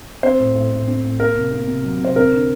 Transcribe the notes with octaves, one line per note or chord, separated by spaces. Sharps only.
C4 C5
A2
A2
A2
C4
A2
A#3 A#4
C3
A#3
C3
F#3
C3 C5
C4 A#4
D3